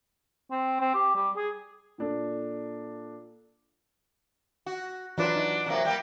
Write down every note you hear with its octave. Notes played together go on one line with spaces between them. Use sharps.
C4
C4
G4
G3
G#4
A#2 D4 A4
F#4
E3 F#3 D4 F4 B4
D#4
C3 F#3 A#3
G3 A#3 G5